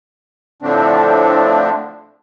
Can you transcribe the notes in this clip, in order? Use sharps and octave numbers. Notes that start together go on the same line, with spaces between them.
A2 D3 F3 A3 C4 D4